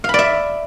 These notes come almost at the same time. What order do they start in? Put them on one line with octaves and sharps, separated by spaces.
F5 B5 D5 E5